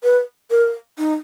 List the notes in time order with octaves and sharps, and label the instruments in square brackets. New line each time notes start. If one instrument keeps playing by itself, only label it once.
[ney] B4
A#4
D#4